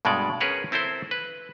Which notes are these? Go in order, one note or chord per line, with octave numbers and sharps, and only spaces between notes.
G2 B2 G#3 A4 D5
C#4 G#4 A#4 B4 C#5 F#5
C4 E4 A4 A#4 C5
B4